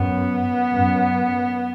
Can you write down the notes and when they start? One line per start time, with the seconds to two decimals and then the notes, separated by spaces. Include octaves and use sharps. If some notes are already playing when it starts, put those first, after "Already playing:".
Already playing: F#2 B3
0.71 F#2